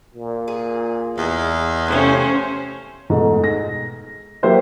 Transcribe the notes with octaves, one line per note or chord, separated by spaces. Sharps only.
A#2
G#4
E2 G#3 B3
C3 F3 A3 C#4 C5
G#2 B2 A3
A#6
F#3 A#3 G4 C5 E5